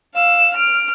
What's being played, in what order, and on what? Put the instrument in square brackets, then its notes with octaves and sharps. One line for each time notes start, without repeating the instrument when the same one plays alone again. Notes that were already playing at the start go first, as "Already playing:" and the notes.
[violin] F5 E6
F6 D7